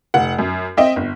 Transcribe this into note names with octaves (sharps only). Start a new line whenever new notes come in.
F1 F#5
F#2
C4 D#5 E5 G5
G1